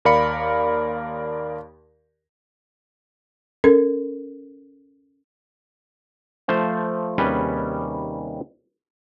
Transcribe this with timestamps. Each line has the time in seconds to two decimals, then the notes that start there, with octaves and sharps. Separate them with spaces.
0.05 D#2 A#4 D5 F5 B5 C#7
3.64 C#4 A4 A#4
6.48 F3 A3 C5 F5
7.18 D#2 C3 G3 C#4 G#4 B4